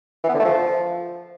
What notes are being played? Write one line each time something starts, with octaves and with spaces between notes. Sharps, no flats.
E3
B3
D3
A3
F3